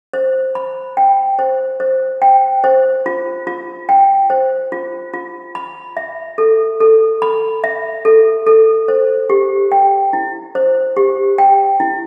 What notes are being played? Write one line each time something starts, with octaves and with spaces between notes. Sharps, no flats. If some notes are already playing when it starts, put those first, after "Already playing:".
C5
B5
G5
C5
C5
G5
C5
F4
F4
G5
C5
F4
F4
B5
E5
A4
A4
B5
E5
A4
A4
C5
G4
G5
E4
C5
G4
G5
E4